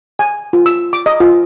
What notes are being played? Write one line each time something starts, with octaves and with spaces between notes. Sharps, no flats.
G#5
F4
E6
D6
D#5
F4